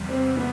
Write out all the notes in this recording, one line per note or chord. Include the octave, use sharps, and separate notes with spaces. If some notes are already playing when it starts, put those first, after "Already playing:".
Already playing: E2 C3 G3
C4
B3